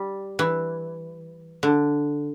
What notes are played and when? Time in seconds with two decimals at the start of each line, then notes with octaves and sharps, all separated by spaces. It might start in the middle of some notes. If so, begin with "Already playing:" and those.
Already playing: G3
0.39 E3
1.63 D3